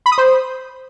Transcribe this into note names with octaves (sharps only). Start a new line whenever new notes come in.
B5
D#6
C5